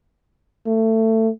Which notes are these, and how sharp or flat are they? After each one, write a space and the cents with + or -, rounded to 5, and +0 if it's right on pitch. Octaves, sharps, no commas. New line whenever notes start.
A3 +20